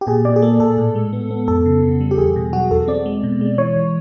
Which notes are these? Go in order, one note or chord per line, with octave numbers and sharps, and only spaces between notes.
G4
A#2 G#4
A#2 D5
G#4
A#3 A4
A#2 A4
A2
G#3
B3
B3
F2 A4
C#3
C#3
G3
G4
E2 G#4
B2
F#3 F#4
E2 A4
C4 D5
G#3
B2
G#3
E3 C#5
E3